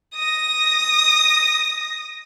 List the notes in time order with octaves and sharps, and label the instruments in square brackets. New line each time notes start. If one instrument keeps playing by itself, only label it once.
[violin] D#6 A#6